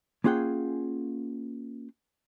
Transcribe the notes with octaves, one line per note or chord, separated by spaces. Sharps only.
A#3 C#4 F4 G#4 F#5 G5